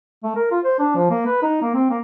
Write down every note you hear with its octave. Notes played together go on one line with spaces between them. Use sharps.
A3
A#4
F4
C5
D4
F3
A#3
B4
D#4
A#3
C4
A#3